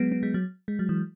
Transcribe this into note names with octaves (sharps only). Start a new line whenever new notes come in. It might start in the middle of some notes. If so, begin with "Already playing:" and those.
Already playing: F#3 G#3 B3
B3
G#3
F#3
G#3
F#3
E3